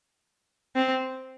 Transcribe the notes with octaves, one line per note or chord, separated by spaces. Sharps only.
C4